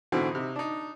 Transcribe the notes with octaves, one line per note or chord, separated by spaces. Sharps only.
G#2 B2 D3 E3 C4 F#4
C3 D#4
D4 D#4